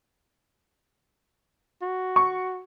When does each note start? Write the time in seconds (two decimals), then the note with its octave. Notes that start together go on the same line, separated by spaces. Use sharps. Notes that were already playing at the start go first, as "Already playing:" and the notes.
1.82 F#4
2.16 C#6